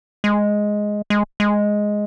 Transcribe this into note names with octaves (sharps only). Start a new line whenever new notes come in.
G#3
G#3
G#3